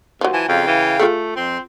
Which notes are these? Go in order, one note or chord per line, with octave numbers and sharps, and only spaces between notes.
D#2 F3 F#3
E3 G#5 A5
F2 C#3 F5 G5
E3
A3 F4 G#4 A4
F2 C4 C6